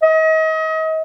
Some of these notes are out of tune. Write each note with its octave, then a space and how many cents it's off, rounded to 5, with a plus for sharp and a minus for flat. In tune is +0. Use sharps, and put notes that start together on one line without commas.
D#5 +35